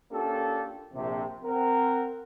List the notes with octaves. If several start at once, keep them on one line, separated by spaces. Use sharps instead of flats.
A#3 C#4 D4 F4 G4 A4
A#1 C3
C4 A#4 F#5